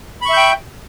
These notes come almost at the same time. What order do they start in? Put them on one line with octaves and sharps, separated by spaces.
B5 C#6 E5 G6 G5